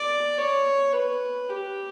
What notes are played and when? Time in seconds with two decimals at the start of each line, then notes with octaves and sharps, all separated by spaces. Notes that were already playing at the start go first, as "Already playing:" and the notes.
Already playing: D5
0.38 C#5
0.93 B4
1.50 G4